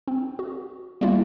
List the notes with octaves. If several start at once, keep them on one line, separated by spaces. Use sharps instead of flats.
C4
F#4
G3 A3 A#3 E4 F4